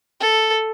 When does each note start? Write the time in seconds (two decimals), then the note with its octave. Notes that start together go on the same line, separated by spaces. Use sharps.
0.20 A4